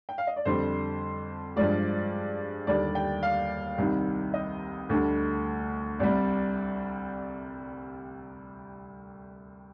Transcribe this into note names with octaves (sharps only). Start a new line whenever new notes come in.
G5
F5
D#5
D5
F2 D3 G3 C5
G2 F3 G#3 D5
D#2 D3 G3 D5
G5
F5
C2 C3 D#3 G3
D#5
D2 D3 G3
C2 C3 G3 D5